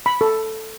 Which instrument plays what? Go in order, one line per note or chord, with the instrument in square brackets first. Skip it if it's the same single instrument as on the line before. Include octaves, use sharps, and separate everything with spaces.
[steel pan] B5
A4